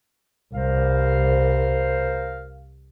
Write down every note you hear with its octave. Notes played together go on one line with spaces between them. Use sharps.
C2 A#4 C5 F5